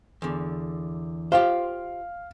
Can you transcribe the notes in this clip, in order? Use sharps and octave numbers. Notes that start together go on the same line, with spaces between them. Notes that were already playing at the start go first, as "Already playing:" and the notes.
E2 D3
F4 G4 C5 F5